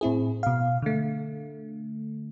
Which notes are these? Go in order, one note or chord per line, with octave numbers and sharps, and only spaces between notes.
A2 C4 E4 G#4
B2 F5
D3 A3